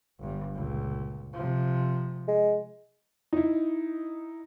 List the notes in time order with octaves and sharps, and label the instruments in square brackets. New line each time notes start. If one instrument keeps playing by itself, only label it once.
[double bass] G1 G2
C#2 A#2
C3 F3
[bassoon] G#3
[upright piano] D#4 E4